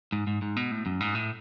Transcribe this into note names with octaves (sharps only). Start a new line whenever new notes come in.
G#2
G#2
G#2
B2
A2
F#2
G#2
A2